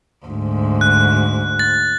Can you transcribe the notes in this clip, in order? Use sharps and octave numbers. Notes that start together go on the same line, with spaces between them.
D2 G#2
F#6
A6